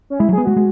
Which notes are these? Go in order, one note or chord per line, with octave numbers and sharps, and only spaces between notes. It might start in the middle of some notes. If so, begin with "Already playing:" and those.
C#4
G#3 E4
F#3
G#4
B3
G#3 F#4
G#3